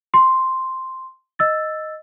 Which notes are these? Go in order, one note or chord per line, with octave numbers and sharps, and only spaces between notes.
C6
D#5 E6 A6